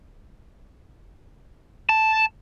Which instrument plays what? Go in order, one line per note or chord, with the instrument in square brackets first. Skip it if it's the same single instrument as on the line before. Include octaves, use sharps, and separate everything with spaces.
[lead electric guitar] A5